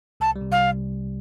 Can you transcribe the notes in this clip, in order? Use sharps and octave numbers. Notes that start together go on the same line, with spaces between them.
C2 A5
G3
C3
C2 F5